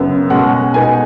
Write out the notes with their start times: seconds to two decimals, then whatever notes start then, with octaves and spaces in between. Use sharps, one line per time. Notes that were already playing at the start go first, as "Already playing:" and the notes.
Already playing: F#2 C#3 B3
0.30 B2 G#3 C#4 F#5
0.74 B2 B3 D#4 G#5